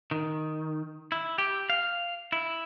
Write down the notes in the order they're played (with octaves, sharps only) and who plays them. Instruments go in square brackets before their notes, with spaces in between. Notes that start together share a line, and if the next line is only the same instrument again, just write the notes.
[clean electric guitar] D#3
E4
G4
F5
E4